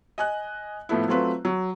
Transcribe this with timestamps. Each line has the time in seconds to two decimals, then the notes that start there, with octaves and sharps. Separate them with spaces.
0.18 D#5 G#5 F#6
0.89 A2 F3 A3 B3 E4
1.08 F#3 A3 C4 F4 B4
1.45 F#3